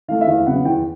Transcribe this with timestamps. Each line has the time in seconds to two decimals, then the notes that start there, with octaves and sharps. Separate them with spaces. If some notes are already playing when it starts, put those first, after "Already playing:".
0.08 E3 A3 F5
0.21 E5
0.27 E2 F5
0.46 C#3 F#3 B3 F#5
0.65 E2 G5